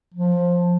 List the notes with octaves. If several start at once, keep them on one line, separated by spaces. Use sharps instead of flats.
F3